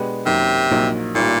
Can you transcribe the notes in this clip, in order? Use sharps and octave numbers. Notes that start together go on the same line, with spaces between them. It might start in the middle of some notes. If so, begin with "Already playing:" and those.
Already playing: B2 G#3 B3 D4 G4
F#2 C3 D#3 F#3 A#3
A#1 A#2 F#3 A#3 D#4
A1 A#2 D#3 G3